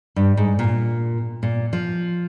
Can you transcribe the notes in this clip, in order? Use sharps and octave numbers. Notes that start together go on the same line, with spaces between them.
G2
G#2
A#2
A#2
F3